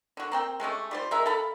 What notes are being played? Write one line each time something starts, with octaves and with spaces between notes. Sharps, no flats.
D3 F#4
A#3 C4 G5
G#3 A3 C#4 G4
G3 F4 C5
G#3 A#4 E5
A4 F5 B5